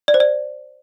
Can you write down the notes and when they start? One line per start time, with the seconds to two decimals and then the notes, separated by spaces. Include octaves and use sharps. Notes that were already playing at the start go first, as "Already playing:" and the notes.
0.08 D5
0.14 C5
0.20 D5